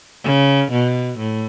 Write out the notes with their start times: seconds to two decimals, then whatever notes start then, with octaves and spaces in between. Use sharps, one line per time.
0.24 C#3
0.71 B2
1.18 A2